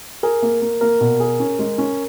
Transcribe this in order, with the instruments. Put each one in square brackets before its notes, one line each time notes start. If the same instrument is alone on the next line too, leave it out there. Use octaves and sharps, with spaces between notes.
[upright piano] G#4 [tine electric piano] A#4
[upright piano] A#3
A#3
[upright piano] A#3 [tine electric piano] A#4
[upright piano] B2
G#4
C#4
G#3
C#4